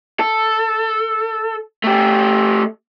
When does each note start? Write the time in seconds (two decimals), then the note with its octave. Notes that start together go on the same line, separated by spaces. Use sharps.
0.20 A4
1.84 A3 G4